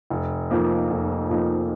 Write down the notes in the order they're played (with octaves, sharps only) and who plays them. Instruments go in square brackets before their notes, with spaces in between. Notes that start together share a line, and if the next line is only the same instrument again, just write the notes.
[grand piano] F1
F2 F3 A#3 D#4
F1
F2 F3 A#3 D#4